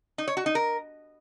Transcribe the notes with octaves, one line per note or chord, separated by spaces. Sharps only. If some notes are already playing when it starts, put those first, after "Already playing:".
D#4
C#5
F#4
D#4
A#4